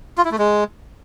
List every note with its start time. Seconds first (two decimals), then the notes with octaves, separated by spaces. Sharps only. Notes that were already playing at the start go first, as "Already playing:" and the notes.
0.18 F4
0.25 E4
0.32 A3
0.38 G#3